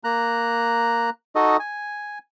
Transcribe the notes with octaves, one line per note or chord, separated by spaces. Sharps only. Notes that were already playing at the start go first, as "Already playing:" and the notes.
A#3 A#5 F#6
D#4 F#4 A4 D#5
G#5